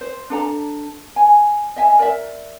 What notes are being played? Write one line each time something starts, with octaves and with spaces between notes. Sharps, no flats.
C5
D4 A4 A#5
G#5
D#5 E5 G#5
A#4 D5 E5